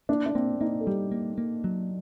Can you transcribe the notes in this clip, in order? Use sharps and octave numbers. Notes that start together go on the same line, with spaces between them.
A#3 D4
D4
A#3 C4
A#3 D#4
A4
G3 G4
A#3
A#3
F#3